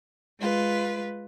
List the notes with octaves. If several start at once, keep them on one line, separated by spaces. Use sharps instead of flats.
G#3 F4 B4